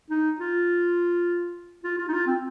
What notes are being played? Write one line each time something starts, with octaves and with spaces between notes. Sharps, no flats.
D#4
F4
F4
F4
D#4
F4
C4